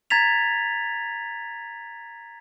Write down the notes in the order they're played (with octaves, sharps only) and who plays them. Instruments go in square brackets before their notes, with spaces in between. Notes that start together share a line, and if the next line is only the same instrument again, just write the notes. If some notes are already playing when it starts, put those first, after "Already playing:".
[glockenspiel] A#5 G#6 A6 B6 F7